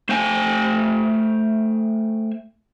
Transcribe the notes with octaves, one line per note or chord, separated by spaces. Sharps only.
A3 C5 G5 G#5